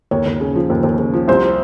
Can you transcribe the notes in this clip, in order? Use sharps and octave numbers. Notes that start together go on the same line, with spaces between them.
D#2 C#5
D#2
C#3
F3
D#2
D#2
C#3
F3
C2 C5